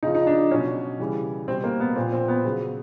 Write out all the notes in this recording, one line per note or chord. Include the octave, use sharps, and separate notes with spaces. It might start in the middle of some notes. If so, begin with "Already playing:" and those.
C#3 F3 D#4
D#4
D4
B2 F#3 C#4
C#3 E3 G3
B2 G3 C4
A#3
B3
A#2 F3 C4
C4
B3
C#3 F#3